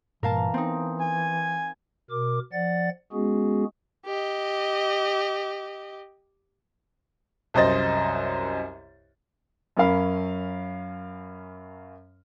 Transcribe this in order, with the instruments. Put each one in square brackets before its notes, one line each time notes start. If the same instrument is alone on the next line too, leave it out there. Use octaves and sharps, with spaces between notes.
[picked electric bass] G2 A#2 [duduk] E3 [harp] A#4 F5 A5
[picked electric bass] B3 [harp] C4 D#4
[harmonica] G#5
[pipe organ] B2 A#4 D6
F3 D5 F#5 A6
G#3 B3 C#4 F#4 G#4
[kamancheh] G4 D#5
[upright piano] C2 F#2 C5 D#5 A6
F#2 C#4 A#4 F5 B5